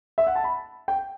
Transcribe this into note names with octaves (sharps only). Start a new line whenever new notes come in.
E5
F#5
A5
B5
G5